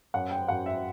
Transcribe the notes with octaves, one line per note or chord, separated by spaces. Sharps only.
F#2 F#5
G5
F#2 F#5
E5